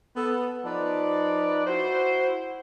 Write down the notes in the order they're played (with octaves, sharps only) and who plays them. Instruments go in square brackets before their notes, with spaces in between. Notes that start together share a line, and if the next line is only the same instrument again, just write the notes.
[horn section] B3 A4
F3 D#4 B4 D5
E4 F#4 C5